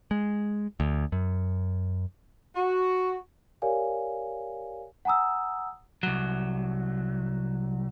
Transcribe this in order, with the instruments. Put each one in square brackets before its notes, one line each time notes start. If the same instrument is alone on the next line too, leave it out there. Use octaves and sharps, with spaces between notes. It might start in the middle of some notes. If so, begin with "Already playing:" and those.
[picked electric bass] G#3
D2
F#2
[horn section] F#4
[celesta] G4 A#4 C#5 D5 F5 G#5
F#5 G#5 A#5 D#6 E6
[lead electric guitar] C2 F#3